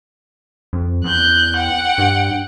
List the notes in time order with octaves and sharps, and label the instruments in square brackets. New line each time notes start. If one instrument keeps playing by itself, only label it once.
[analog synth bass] F2
[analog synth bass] E2 [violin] F#6 G6
[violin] F#5 G5
[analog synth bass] G2